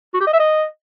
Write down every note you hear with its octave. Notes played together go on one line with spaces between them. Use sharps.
F#4
G4
D#5
E5
D#5